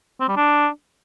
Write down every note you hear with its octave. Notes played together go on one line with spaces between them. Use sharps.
C4
G3
D4